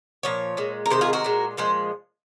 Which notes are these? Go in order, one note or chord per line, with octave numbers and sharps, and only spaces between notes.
A#2 F3 C#5
A#2 G#3
A#4
C3 D#3 G#3 C5
F4 G#4
F#4 A#4
A#2 G#3
A#2 F3 G#3 C5